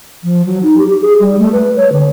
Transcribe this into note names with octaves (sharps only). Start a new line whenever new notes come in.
F3
F#3
D#4
G4
G4
G#4
G3
A3
B4
C#5
D3